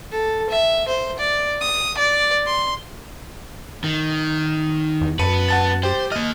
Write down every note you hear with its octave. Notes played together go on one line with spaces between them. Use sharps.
A4
E5
C5
D5
D#6
D5
C6
D#3
E2
F#2 B3 B4 A5 C#7 D#7
F#5 A5 A6
G4 C5 G5
A#3 D#5 F6